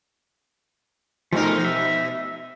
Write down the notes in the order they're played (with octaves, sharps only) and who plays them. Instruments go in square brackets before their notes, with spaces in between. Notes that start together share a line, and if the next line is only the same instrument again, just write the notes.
[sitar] B2 D#4 [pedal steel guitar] F3 A3 A#4
[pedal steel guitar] E5